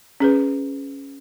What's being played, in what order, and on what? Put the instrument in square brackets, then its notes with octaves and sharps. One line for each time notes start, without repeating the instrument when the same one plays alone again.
[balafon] C#4 G#4 B4